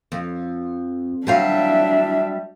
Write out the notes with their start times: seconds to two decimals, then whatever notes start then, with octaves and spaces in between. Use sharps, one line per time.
0.12 F2
1.27 F#3 G3 D4 E5 F5